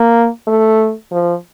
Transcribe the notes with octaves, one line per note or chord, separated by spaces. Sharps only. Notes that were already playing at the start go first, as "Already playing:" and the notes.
Already playing: A#3
A3
F3